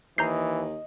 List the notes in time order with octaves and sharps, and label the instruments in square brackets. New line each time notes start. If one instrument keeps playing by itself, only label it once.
[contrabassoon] D#2 [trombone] E3 [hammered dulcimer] D#5 [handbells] A#5 G6 C7